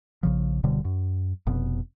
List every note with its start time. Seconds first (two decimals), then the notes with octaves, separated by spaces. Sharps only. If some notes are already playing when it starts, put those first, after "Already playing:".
0.23 A#1 C#3 F3
0.63 D1 B2 D3 G3
0.85 F#2
1.47 F1 B2